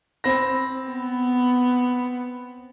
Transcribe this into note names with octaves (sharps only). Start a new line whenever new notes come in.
C4 B5 A#6
B3